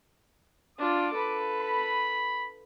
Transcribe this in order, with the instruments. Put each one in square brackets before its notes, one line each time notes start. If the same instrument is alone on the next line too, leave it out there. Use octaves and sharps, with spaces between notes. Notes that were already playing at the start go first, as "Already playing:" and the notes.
[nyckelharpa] D4 F4 [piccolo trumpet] D6
[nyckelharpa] A4 B4
[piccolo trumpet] B5